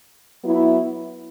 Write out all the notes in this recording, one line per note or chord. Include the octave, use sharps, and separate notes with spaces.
F#3 B3 E4